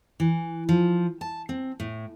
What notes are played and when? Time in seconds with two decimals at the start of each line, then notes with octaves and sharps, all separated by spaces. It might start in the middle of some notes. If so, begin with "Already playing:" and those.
0.20 E3
0.69 F3
1.21 A5
1.49 C4
1.80 A2